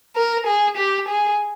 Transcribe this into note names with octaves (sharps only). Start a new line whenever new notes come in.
A#4
G#4
G4
G#4